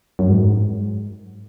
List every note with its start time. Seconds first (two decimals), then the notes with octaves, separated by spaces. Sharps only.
0.19 F#2
0.29 G#2